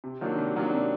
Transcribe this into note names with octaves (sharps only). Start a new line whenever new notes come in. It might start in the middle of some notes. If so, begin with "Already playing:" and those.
C3
D#3 F#3 A#3 D4
C3
D#3 F#3 A#3 D4
C3